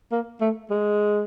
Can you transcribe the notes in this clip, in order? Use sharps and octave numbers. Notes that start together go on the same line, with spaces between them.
A#3
A3
G#3